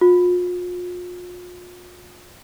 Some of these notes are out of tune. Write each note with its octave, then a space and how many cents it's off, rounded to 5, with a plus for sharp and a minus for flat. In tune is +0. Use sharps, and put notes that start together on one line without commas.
F4 +40